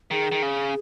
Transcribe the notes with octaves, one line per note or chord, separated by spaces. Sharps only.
D#3 G#4
D#3
C#3